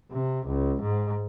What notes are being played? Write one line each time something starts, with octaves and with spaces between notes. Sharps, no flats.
C3
C#2
G#2